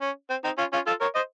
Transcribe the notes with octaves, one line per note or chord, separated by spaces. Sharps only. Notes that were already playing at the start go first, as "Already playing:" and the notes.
C#4
C4
C4 D#4
C#4 F4
C#4 F4
F4 A4
A#4 C#5
C5 D#5